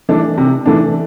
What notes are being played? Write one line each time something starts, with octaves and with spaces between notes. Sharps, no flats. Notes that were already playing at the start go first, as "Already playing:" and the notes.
E3 A3 D4
C3
E3 A3 D4